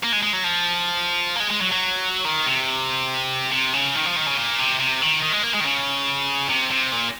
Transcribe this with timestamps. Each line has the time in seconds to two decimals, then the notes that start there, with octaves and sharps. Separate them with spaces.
0.04 A#3
0.12 G#3
0.23 G#3
0.33 F#3
0.44 F3
1.36 A#3
1.40 G#3
1.50 G#3
1.61 F#3
1.72 F#3
2.25 D#3
2.46 C3
3.52 C3
3.73 C#3
3.95 D#3
4.05 F3
4.16 D#3
4.26 C#3
4.37 A#2
4.58 C3
4.80 C3
5.02 D#3
5.22 D#3
5.33 G#3
5.43 A#3
5.55 G#3
5.60 D#3
5.64 C#3
6.49 C3
6.71 C3
6.92 A#2